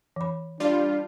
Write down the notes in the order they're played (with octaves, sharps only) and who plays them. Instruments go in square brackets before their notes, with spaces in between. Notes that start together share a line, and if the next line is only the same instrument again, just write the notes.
[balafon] E3 B5
[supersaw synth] G3 F4 [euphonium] D4